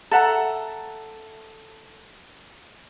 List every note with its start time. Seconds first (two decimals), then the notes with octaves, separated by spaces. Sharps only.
0.11 A4 E5 F#5 A#5